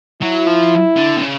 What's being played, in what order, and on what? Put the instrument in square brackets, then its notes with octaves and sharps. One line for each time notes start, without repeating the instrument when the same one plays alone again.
[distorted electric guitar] F#3 [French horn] E4
[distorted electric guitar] F3
D3
C3
C#3